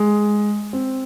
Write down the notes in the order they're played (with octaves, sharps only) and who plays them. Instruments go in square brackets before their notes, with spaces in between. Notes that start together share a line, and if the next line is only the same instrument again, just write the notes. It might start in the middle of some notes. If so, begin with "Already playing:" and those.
Already playing: [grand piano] G#3
C4